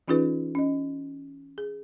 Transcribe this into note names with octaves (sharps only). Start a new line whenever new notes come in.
E3 C#4 D#4 F4 G#4 B4
C#4 D#5
G#4